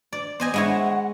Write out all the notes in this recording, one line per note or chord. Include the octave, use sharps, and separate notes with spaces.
D5
B3 C5 D#5 G#5
G#3 E4 C#5 F#5